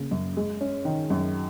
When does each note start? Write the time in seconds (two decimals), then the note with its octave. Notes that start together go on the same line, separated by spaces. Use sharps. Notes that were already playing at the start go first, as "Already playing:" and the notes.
Already playing: C#3 A#3
0.11 F#2
0.37 G#3
0.61 C#4
0.85 D#3
1.10 F#2